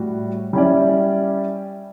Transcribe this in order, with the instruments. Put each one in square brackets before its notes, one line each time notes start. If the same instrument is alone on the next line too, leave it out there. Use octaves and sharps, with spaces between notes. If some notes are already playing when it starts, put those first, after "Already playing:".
Already playing: [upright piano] A2 G3 F#4
G3 C#4 E4 G4 D5